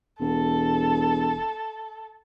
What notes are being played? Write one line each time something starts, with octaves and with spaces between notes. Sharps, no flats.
E1 A4